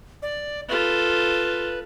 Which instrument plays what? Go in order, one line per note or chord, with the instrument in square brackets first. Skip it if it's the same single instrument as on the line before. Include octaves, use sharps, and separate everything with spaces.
[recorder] D5
[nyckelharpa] F4 A4 [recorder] B4